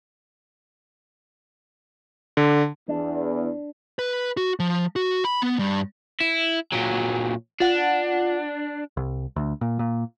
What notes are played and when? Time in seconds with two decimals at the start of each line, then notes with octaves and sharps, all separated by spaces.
2.37 D3
2.89 E2 D4
3.99 B4
4.37 F#4
4.60 F3
4.96 F#4
5.25 B5
5.42 B3
5.59 G2
6.20 E4
6.72 A#2 F#3
7.60 D4 F4 F#5
8.97 C2
9.36 D2
9.61 A#2
9.79 A#2